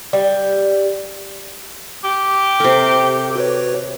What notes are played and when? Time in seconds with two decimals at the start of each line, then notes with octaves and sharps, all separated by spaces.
0.13 G3
2.04 G4
2.60 C3 A4 A#4
3.36 F#4 B4 C#5